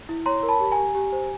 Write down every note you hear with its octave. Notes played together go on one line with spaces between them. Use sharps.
E4
C#5 A#5 C6
A#4
A5 B5
G4
G#5 A#5
G4
G4
C5